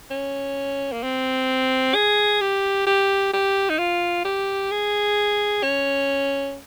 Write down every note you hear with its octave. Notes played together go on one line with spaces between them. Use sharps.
C#4
A#3
C4
G#4
G4
G4
G4
D#4
F4
G4
G#4
C#4